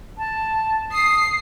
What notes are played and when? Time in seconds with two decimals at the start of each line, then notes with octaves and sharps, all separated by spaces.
0.18 A5
0.92 D#6 C7